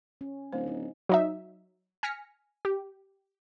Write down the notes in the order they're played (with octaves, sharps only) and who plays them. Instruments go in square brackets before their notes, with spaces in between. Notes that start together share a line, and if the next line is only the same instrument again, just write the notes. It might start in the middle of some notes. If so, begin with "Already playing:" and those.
[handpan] C#4
[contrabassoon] D1 [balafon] A3 C5
[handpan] D#4
[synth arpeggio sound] F#3 D#4 E5
G#5 F6 A#6 B6 C#7
G4